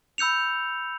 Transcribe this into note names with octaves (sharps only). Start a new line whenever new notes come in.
B5 E6 G6 C#7 F7